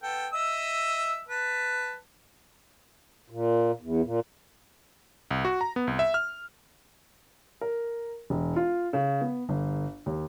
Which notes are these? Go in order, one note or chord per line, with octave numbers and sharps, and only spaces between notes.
B3 A4 G5
D#5 E5 E6
B4 A5
A#2
E2
A#2
C2
F#4
A#5
B3
C2
E5
F6
A#4
E1
F4
C#3
B3
G1
D#2